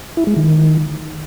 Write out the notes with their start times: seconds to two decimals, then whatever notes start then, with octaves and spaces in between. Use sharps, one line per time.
0.17 E4
0.27 G#3
0.37 D#3